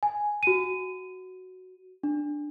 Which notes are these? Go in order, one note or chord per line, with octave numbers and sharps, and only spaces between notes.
G#5
F#4 D#7
D4